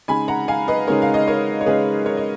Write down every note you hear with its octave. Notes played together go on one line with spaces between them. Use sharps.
C#3 G#3 D#4 G#5 B5
F#5 A#5
F5 G#5
B4 D#5
C#3 G#3 D#4 A#4 C#5
F5
D#5
A#4 C#5
C#5
C#3 G#3 D#4 G#4 B4
A#4 C#5
D#5